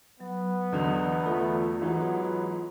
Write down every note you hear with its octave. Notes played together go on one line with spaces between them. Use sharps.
F#3 B3
E2 D3 F#3 D#5
A3 F4
G#2 E3 F#3 B3